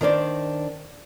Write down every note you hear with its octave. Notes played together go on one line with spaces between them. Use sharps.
D#3 D4 C5 D5